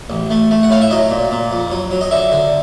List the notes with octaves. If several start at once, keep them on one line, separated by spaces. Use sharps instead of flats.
A1
A3
A3
F#5
A2 F5
E5
F#3 D#5
A#2
A#2
F2
F#3
F#3
D#5
D3 E5
D3